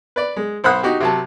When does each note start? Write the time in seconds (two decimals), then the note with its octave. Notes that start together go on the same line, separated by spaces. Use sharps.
0.16 B4 D5
0.36 G#3
0.64 B1 C5 F#5 B5 D#6 F#6
0.83 D#4 F#4 G4
1.00 C3 F#3 A5